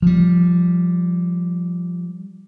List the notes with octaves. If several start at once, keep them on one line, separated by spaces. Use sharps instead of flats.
F3 G3